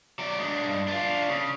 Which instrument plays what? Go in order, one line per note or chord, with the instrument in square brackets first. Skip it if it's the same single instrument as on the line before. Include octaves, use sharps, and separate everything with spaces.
[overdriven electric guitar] F#3 D5
G#3 D4
G2
D4 F4
C#3